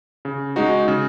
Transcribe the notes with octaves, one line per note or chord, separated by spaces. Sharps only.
C#3
G#3 D#4 F#4
C#3